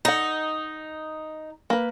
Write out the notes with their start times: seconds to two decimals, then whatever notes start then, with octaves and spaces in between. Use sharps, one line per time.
0.05 D#4 A4 F#5
1.70 A#3 B4